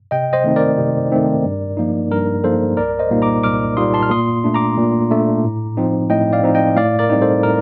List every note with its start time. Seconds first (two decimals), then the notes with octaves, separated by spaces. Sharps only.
0.11 C3 D#5 G5
0.33 C5 D#5
0.44 D#3 A3 C4 D#4
0.56 A#4 D5
0.78 C3
1.11 D#3 A3 C4 D#4
1.44 G2
1.77 F3 A#3 D#4
2.11 G2 A#4
2.44 F3 A#3 D#4 A4 C5
2.77 C2 A#4 D5
2.99 C5 D#5
3.11 A#2 G3 A#3 D#4
3.22 A#5 D6
3.43 C2 D6 F6
3.77 A#2 G3 A#3 D#4 C6 D#6
3.94 A5 C6
4.03 F6
4.10 A#2 C6 D#6
4.44 A3 D4
4.54 A#5 D6
4.78 A#2
5.11 A3 D4
5.44 A2
5.77 F3 C4 D#4
6.10 A2 D#5 G5
6.33 D5 F5
6.44 F3 C4 D#4
6.55 D#5 G5
6.76 A2 D5 F5
6.99 A#4 D5
7.10 G3 C4 D#4
7.22 A4 C5
7.43 A2 A#4